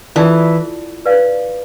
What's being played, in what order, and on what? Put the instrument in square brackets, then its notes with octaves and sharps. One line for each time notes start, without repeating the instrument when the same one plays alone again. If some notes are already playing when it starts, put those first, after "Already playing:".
[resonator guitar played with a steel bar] E3 [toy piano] F4 A4 D5 A5
[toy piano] B4 D5 F5